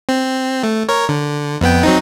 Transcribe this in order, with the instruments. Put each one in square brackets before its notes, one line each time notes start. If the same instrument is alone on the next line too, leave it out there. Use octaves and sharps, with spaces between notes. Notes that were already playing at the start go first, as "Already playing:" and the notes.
[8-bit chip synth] C4
A3
A#4 C#5
D3
F2 B3 G5
F#3 C4 D#4